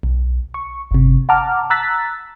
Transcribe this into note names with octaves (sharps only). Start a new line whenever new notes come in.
B1
C#6
G1 C3
F#5 A5 A#5 D6 F6
A#5 E6 F#6 A6 B6